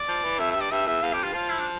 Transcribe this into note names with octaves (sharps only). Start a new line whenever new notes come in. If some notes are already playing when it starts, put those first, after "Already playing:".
Already playing: D5
F3
E3
F2 E5
E5
G2
D5
G2 E5
E2 E5
E2 F5
F2 G4
G2 F4
F3 F4
E4
D4